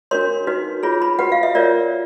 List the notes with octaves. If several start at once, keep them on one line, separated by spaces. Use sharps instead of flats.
D4 F#4 A#4 C#5 C6
D#4 F#4 B4
F4 G#4 C#5 B5
B5
F#4 B4 F#5
F5
E5
F4 A#4 C#5 D5